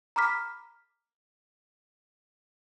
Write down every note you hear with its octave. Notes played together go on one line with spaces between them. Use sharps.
A#5 B5 D6 F6 B6